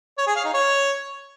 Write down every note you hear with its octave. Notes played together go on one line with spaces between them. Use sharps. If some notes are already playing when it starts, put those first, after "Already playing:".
C#5
G#4
F5
D#4
C#5